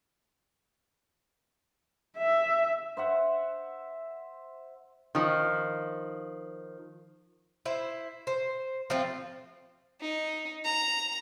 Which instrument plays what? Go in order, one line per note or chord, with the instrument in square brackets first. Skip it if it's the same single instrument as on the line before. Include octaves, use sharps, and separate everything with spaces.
[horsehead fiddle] E5
[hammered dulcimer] C5 E5 F#5
[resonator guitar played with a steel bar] D#3 F3
[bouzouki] E4 C5
C5
F3 A3 C4 F4
[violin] D#4
A#5